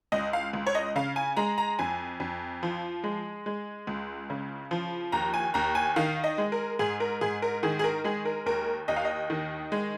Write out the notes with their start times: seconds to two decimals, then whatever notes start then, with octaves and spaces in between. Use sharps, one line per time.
0.12 C#2 D#5
0.33 F5
0.53 C#2
0.67 C#5
0.75 D#5
0.96 C#3 F5
1.16 G#5
1.37 G#3 A#5
1.58 A#5
1.79 F2 G#5
2.20 F2
2.63 F3
3.04 G#3
3.46 G#3
3.87 C#2
4.30 C#3
4.71 F3
5.12 D#2 A#5
5.34 G#5
5.54 D#2 A#5
5.75 G#5
5.96 D#3 F5
6.24 D#5
6.38 G#3
6.52 A#4
6.79 G#2 G#4
7.00 A#4
7.21 G#2 G#4
7.42 A#4
7.63 D#3 G#4
7.79 G#4
7.84 A#4
8.04 G#3 G#4
8.25 A#4
8.46 D#2 A#4
8.88 D#2 D#5
8.97 F5
9.05 D#5
9.30 D#3
9.72 G#3